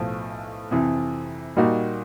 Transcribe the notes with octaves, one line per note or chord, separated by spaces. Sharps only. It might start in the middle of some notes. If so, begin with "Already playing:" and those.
Already playing: B1 A2 F3
F2 C3 E3
A#2 G3 A#3 D#4 F#4